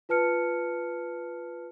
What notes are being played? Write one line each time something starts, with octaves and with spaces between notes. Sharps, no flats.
F4 B4 A5 F6 C#7